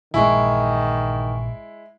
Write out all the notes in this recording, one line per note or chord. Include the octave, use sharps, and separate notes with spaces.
A#1 G2 D#3 E3 G#3 E4 G#5 C#6